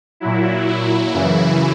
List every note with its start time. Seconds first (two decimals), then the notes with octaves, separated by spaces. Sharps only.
0.20 A#2 F#3 E4
0.67 E4
1.13 F#2 C#3 E3